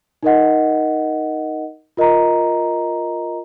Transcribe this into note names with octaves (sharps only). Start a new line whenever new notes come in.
D#4 A#4 D#5 F#5
F4 A#4 D#5 A#5